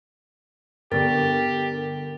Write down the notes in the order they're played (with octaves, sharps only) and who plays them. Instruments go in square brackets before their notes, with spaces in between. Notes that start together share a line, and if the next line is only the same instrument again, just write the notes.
[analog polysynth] G2 D3 [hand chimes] B3 A6 [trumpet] G4 [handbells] A#4